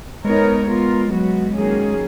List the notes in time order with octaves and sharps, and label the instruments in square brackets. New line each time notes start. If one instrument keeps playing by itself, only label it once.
[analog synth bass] G#3 [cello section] B3 D#4 A#4 C#5
[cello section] B3 F4 A#4
F#3 B3 F#4
D#3 F#3 A#3 C#4 G#4